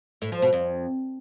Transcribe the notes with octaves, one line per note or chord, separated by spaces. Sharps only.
A2
F3
B2
F2